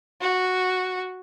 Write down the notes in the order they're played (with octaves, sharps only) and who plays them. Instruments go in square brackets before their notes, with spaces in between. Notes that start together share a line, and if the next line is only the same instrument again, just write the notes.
[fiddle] F#4